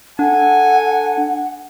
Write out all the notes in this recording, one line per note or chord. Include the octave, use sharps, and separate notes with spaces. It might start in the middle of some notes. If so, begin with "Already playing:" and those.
D4 A4 F#5 G#5